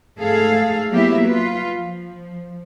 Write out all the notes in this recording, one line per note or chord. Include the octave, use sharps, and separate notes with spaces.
G#2 A3 G#4 A4 F5
F#3 A#3 B3 E4 G4 E5
F4 B4
F3